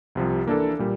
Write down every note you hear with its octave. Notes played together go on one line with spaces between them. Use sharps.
C2 C3 F3
E3 A#3 D4 A4
A#2 G3